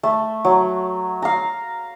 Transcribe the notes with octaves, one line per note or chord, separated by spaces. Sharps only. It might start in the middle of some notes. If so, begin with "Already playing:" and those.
A3
F#3
F5 A#5